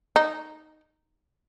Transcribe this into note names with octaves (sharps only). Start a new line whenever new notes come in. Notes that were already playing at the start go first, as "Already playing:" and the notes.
D#4